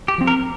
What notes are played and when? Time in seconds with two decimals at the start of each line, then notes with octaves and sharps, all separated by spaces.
0.08 G4
0.18 F3 C4
0.27 A#4